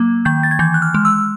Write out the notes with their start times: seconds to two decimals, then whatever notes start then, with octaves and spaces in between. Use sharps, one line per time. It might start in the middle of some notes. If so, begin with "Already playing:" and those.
Already playing: F#3 A#3
0.25 D#3 G6
0.43 A6
0.51 G#6
0.59 E3 G6
0.74 F#6
0.82 F6
0.94 G#3
1.05 E6